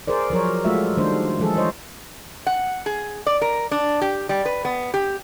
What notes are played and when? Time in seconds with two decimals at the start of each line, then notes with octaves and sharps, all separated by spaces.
0.07 G#4 A#4 C5 D5
0.30 F3 F#3 A#4 C#5
0.65 G#3 A3 F4 F#4 E5
0.97 D#3 G3 A3 D4 C5
1.39 E3 F3 G#3 G#4 A4
1.57 C5 C#5 D#5
2.47 F#5
2.86 G#4
3.27 D5
3.42 A#4
3.71 D4
4.02 G4
4.29 G3
4.45 B4
4.65 B3
4.94 G4